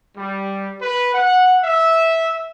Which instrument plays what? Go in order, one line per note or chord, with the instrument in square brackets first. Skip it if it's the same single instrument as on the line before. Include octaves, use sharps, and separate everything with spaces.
[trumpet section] G3
B4
F#5
E5